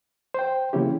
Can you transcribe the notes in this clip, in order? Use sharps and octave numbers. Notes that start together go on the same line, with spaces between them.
C5 G5
C#3 E3 A#3 C#4 E4 G4